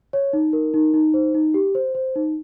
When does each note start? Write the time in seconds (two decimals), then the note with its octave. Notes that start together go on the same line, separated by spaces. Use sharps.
0.13 C#5
0.33 D#4
0.53 A#4
0.74 D#4
0.94 D#4
1.14 C5
1.34 D#4
1.54 G4
1.75 C5
1.95 C5
2.16 D#4